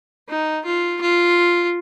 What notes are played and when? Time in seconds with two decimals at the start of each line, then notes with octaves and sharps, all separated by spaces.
0.28 D#4
0.65 F4
1.01 F4